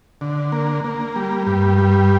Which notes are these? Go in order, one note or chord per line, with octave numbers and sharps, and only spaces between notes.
D3
A#3
A#3
G3
G2
G3